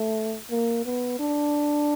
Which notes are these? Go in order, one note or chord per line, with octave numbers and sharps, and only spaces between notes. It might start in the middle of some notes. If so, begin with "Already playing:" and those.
Already playing: A3
A#3
B3
D4